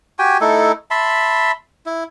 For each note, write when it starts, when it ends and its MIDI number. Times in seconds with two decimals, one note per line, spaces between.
0.19 0.38 66
0.19 0.38 67
0.19 0.38 79
0.19 0.38 80
0.41 0.72 57
0.41 0.72 63
0.41 0.72 64
0.41 0.72 69
0.91 1.52 76
0.91 1.52 81
0.91 1.52 83
0.91 1.52 84
1.86 2.04 64